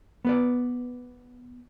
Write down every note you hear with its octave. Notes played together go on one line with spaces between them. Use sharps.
B3 B4 D5